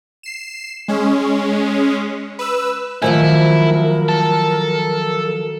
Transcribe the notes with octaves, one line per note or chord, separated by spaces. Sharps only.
C7 E7
G#3 C#4
B4 E6
D#3 F3 F#3 A3 E4 A#4 C5 G#5
A4